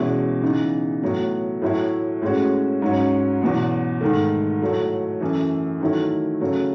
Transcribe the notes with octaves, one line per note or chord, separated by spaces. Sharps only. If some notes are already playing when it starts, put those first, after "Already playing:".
Already playing: E2 B2 G#3 C#4 E4
C#3 E3 B3 D#4
A2 F#3 B3
A2 F#3 A3 E4
A2 G#3 C#4 F#4
G#2 F#3 C#4
E2 B2 F#3
G#2 D#3 A3
A2 F#3 A3
F#2 E3 A3
D#3 F#3 A3 E4
C#3 F#3 A3